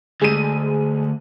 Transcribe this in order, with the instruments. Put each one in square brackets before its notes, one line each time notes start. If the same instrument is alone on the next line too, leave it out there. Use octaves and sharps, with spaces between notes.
[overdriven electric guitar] D2 [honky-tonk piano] G#3 D#7